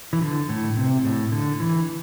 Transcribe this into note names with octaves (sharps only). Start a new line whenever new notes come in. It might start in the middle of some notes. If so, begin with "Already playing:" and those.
E3
D3
A2
C3
A2
D3
E3